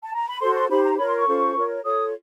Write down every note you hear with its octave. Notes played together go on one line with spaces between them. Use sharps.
A5
A#5
B5
F#4 A4 C5 C6
C6
D#4 G4 C5 B5
A#5
F4 A#4 C#5 B5
C6
C#6
C#4 F4 A4 C5
F4 A#4 C#5
F4 A4 C#5 D#6